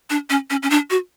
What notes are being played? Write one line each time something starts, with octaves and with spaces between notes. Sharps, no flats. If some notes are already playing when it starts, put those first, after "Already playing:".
D4
C#4
C#4
C#4
D4
F#4